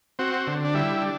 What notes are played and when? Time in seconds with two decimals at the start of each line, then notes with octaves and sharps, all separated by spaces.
0.19 C4 F#4
0.47 D3
0.64 D4
0.74 G3 E4
1.02 D4